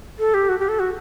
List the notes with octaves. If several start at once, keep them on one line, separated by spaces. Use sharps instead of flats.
A4
G4
F#4
G4
A4
F#4